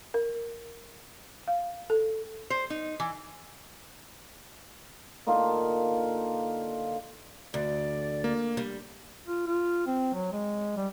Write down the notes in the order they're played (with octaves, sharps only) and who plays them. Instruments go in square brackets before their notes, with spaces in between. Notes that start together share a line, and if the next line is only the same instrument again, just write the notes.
[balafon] A#4
F5
A4
[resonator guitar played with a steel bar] C5
D#4
E3
[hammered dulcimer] D3 A#3 D#4 F4
[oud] D2 [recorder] D5
[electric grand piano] A#3
[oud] G3
[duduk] F4
F4
C4
F#3
G#3
G3